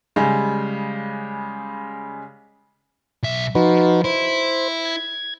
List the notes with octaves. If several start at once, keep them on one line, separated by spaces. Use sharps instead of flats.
C#3 G3 G#3 G#4
B1 E5
F3 D#4 F#4 B4
E4 C5
G#6